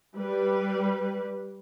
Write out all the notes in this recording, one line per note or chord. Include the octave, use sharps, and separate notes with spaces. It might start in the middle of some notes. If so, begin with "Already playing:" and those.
G3 B4